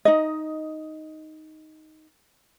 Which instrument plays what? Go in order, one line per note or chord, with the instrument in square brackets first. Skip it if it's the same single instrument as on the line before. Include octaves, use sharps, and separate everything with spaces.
[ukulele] D#4 D#5